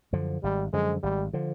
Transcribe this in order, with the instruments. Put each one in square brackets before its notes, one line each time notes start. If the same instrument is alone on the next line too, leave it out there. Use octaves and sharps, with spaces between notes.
[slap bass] F#2 D3 F3
[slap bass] G#1 [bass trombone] G3
[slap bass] F#2 D3 F3 [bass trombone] G#3
[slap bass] G#1 [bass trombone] G3
[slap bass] D3 F3